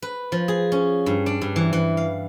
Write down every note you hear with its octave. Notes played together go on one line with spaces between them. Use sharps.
B4
F3
G#4
C#4
G2
D4
G2
E3
E3
F5